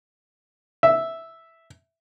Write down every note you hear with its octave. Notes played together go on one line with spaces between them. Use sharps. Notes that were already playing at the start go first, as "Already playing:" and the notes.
E5